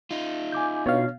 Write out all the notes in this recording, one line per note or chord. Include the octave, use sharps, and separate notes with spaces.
D#4 F4
G#5 D6 G6
B2 D4 C#5 F5